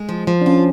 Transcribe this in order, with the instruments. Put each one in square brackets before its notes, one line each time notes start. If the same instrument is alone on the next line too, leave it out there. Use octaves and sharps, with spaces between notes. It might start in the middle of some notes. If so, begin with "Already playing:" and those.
Already playing: [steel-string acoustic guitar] G#3
F3
F3
[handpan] D4
[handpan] C#4 [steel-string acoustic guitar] F4